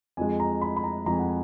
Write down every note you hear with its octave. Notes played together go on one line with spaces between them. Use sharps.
F2 F3 G#3 G#5
A#5
B5
B5
A#5
F2 F3 G#3 A#5
G#5
F#5
G#5